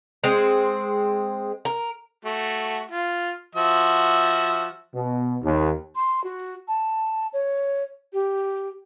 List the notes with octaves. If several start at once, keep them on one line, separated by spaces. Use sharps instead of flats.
G#3 C4
A#4
A3 F#4
F4
F3 F#4 E5
B2
D#2
C6
F#4
A5
C#5
G4